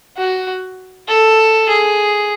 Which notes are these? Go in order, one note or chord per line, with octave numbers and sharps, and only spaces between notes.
F#4
A4
G#4